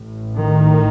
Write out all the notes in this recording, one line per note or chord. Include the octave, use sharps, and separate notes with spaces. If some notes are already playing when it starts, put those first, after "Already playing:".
Already playing: A1 A2
D#3